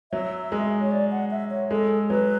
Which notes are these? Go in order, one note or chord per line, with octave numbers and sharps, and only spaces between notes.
F#3 E5
G#3
C#5
D5
F#5
E5
C#5
G#3 A4
F#3 B4